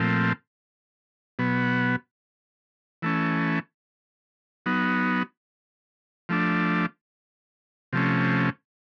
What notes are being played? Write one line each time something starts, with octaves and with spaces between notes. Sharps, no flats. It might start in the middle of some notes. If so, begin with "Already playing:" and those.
Already playing: A#2 F3 A3 C4
B2 F#3 B3
E3 A3 C#4
F#3 B3 D#4
F3 A3 D4
C3 F3 A3 C#4